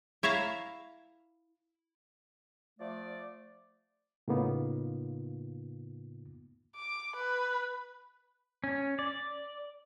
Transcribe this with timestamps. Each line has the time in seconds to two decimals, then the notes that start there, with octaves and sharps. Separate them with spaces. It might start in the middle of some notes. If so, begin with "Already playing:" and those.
0.23 E4 C#5 E5 F5 A#5
2.80 F3 A3 D5
4.28 A2 C#3 A#3 B3 D#4 F4
6.76 D6
7.16 B4
8.64 C#4
8.99 D5